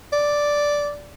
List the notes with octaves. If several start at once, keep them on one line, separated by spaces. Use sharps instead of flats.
D5